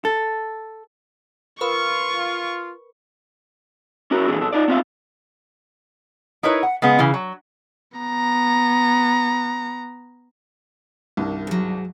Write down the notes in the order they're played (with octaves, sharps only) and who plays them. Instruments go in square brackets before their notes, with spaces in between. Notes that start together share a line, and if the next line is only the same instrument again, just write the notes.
[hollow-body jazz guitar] A4
[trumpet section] F4 [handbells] A#4 B4 B5 [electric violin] C#6
[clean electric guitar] C#4 E4 F#4 A#4
A#2 D3 E3 G#4
B2 A4
D#4 F4 D5
B3 C4 F4 C#5 E5 F5
[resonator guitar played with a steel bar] D#4 E4 A#4 B4 C#5
F#5
C#3 G#3 B3
C#3 E3
F#3
[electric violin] B3 A#5
[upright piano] C2 G2 D#3
[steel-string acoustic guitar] G#2 F#3